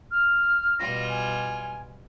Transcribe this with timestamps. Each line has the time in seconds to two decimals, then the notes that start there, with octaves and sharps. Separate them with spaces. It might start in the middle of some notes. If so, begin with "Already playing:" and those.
0.11 F6
0.79 B2 G3 F4 A#6
1.09 G#5